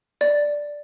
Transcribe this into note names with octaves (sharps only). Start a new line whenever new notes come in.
D5